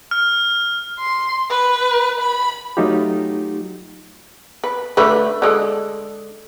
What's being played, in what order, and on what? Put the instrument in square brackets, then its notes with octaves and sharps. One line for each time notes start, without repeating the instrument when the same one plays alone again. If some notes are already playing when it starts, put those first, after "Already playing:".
[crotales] F6
[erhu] C6
B4
B5
[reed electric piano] F#3 A3 D#4 F4 G4
[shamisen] B4
D3 A3 B4
D3 G#3 A4